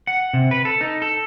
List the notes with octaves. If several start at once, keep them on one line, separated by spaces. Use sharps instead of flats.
F#5
C3
B4
A4
D#4
A4